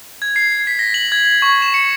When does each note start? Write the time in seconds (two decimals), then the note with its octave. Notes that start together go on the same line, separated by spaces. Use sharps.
0.22 G#6
0.36 C7
0.67 B6
0.79 A#6
0.94 F#7
1.12 G#6
1.42 C#6
1.62 E7
1.74 C#7